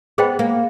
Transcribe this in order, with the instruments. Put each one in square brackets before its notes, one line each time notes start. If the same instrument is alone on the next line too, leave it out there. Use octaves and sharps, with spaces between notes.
[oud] B3 [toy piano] G#4 C5 D#5 G5 B5
[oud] A#3